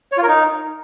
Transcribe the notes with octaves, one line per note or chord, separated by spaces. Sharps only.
C#5
F4
A#4
D#4